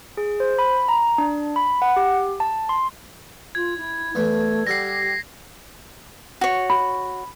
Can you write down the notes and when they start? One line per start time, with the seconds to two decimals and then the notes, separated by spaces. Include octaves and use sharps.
0.17 G#4
0.40 C5
0.59 B5
0.89 A#5
1.18 D4
1.56 B5
1.82 F#5
1.96 G4
2.40 A5
2.69 C6
3.55 F4 G#6
3.77 E4
4.15 E2 E3 A3
4.67 G3 G4 A4 F#5 A#6 C7
6.41 F#4 C#5
6.70 B5